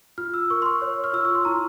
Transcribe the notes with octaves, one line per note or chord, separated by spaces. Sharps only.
F4 F6
E6
A#4 C#6
C6
C#6
C#5
F6
F4 E6
C#6
C6
E4 A#5